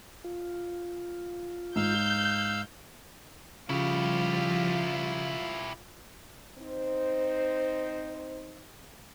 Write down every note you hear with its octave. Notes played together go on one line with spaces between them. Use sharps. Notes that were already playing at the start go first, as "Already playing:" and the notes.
F4
G#2 F5 E6 G6
C#3 F3 G3 E4 F4 G4
C4 D#4 C5